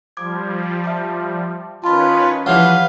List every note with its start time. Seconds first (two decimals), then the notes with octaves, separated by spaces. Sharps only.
0.17 F3 G3 D6 G#6
0.84 E5 A5 D6
1.84 D#3 C#4 F4 B4 A5 B5
2.46 E3 F3 G4 B4 C#5 F5 F#5